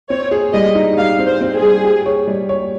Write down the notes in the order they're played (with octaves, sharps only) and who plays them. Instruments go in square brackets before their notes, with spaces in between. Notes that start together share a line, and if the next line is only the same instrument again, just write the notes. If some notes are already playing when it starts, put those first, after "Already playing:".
[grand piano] C4 [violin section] C#5
[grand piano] G#4
[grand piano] G3 [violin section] D#5
[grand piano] D#4
[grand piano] G3 [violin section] F5
[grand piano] C4
[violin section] C5
[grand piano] C4
[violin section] G#4
[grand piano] G3
G4
C#5
G3
C#5